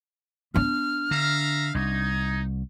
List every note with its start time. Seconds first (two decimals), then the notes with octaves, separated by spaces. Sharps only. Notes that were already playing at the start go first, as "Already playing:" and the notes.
0.54 B3 D4 F6
1.11 D3 E5 F5 A#5
1.75 C2 D#4 G#6